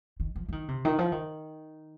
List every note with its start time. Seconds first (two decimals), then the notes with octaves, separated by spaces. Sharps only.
0.20 D#3
0.36 F3
0.49 F3
0.52 D#3
0.68 C3
0.85 D#3
0.98 F3
1.12 D#3